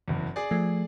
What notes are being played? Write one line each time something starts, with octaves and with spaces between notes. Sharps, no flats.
F#1 E2
G#4 D5
F3 A3